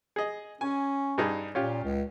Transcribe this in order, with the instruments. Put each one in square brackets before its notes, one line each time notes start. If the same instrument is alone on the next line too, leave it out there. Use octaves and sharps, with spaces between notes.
[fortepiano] G#4 D#5
[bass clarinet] C#4 [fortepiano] G#5
[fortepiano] G2 D#4 G#4
[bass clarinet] A#2 [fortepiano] C#4 F4 G4
[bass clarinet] C#2